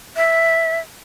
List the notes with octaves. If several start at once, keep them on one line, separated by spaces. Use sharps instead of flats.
E5